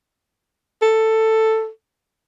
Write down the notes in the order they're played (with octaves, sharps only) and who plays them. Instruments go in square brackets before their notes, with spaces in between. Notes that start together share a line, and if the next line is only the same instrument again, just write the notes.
[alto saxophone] A4